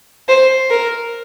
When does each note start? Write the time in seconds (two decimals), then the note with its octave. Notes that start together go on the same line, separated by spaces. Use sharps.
0.29 C5
0.71 A#4